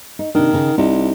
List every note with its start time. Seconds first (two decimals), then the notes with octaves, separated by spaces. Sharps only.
0.19 D#4
0.35 C3 D#3 D4
0.53 C#3 D#4
0.78 C2 D4 D#4